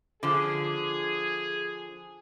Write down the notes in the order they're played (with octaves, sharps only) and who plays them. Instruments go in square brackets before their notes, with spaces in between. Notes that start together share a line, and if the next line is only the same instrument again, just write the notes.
[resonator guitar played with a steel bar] D3 F3 [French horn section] G#4